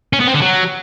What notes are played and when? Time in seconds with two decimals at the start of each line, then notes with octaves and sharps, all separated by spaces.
0.13 C#4
0.20 B3
0.27 C4
0.34 D3
0.41 F#3